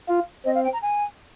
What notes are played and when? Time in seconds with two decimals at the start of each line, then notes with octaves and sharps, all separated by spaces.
0.08 F4
0.45 C4 D#5
0.55 F5
0.64 G5
0.73 A#5
0.82 G#5